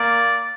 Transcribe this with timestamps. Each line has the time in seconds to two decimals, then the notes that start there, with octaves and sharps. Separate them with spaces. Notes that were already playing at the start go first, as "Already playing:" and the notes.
Already playing: A#3 D5